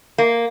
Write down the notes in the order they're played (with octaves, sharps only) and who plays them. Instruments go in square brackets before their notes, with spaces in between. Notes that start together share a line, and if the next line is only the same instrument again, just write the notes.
[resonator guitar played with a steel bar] A#3